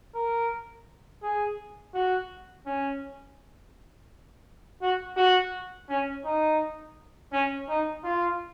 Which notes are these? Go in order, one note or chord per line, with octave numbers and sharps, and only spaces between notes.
A#4
G#4
F#4
C#4
F#4
F#4
C#4
D#4
C#4
D#4
F4